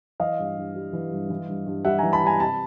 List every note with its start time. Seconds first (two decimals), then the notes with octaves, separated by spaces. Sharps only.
0.20 E3 D#5 F5
0.39 G2
0.57 G2
0.76 G3
0.93 E3
1.12 G2
1.30 E3
1.48 G2
1.67 G2
1.85 G3 E5 F#5
1.98 E3 G#5 A#5
2.12 A5 B5
2.22 G2 G#5 A#5
2.40 C3 A5 B5